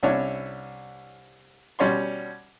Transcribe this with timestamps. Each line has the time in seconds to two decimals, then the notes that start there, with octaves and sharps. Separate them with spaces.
0.03 C2 C#4 D4 E4 C#5
1.79 B2 G3 C#4 C#5 D5 C6